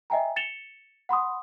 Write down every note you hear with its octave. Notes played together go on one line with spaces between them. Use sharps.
D#5 E5 G5 G#5 A#5
A6 C#7 E7 F7 G7
F#5 B5 C6 D#6